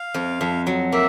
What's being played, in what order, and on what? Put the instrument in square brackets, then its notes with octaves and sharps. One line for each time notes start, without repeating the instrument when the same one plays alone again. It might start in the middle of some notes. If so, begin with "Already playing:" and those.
Already playing: [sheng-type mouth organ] F5
[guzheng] F2
F2
F#3
[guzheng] A#3 [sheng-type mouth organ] E5